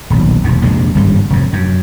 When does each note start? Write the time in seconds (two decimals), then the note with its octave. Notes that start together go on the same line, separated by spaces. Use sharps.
0.10 D#1 B1
0.44 E1 D#2
0.62 A#1 F2 C3 G#3
0.95 G#1 G2 C#3 G3
1.30 F1 F#2
1.53 F#2